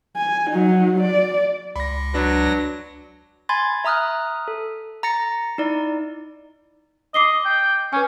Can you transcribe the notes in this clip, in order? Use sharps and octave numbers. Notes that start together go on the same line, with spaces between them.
G#5
F#3 D#4
D5
C#2 B5 A#6
F#3 D4 B4 A#6
G#5 B5 C6 G#6 A6
E5 A#5 D#6 F6 F#6
A4
A#5 A6 A#6 C#7
D#4 E4 D5
D#5 D6 C7 G7
G5
C#4 B4 G#5